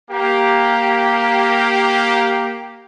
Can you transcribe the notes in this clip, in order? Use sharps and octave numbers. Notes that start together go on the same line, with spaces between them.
A#3 G4